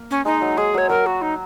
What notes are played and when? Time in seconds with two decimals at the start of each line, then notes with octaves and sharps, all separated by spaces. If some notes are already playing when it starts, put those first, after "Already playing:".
Already playing: A#3
0.11 C#4
0.25 G#3 D#4
0.42 F#3
0.57 G#3 G#4
0.74 F#3 C#5
0.89 F#3 A#4
1.06 F#4
1.22 D#4